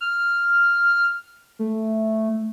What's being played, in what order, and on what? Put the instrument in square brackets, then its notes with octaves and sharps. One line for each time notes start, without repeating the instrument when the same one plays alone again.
[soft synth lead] F6
A3